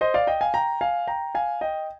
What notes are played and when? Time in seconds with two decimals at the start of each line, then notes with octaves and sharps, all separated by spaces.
0.01 C5 D#5
0.14 D5 F5
0.27 D#5 G5
0.41 F5 G#5
0.54 G5 A#5
0.81 F5 G#5
1.07 G5 A#5
1.35 F5 G#5
1.61 D#5 G5